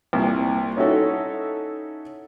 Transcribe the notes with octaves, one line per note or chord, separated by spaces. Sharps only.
C2 A#2
C#4 D#4 E4 F#4 A4 C#5